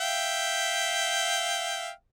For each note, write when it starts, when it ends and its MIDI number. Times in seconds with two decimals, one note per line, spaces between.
0.01 1.91 76
0.01 1.91 77
0.01 1.91 79